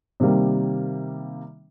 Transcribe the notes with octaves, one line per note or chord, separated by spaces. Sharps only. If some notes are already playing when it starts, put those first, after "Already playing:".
C3 D#3 G3 A#3